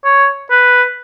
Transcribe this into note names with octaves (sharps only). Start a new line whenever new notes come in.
C#5
B4